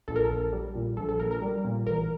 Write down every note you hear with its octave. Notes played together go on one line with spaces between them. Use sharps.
A#1 A4
A#4
A4
A#1
G3
A#2
A#1 A4
A4
A#1 A#4
A#4
G3
A#2
A1 A#4